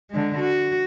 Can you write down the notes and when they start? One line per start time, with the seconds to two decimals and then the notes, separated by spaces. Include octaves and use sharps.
0.11 D3 G#3
0.40 F#4